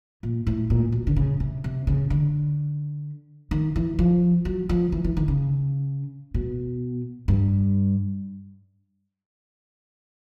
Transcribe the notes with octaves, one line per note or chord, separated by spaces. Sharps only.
A#2
A2
A#2
B2
D3
C#3
C3
C3
C#3
D3
D#3
E3
F3
F#3
F3
E3
E3
D#3
C#3
B2
G2